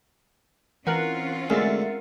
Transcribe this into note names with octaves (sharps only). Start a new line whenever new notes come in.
E3 C4 C#4 F4 A#4 F#5 F#6
D2 G#3 A#4 E5 F#5 A6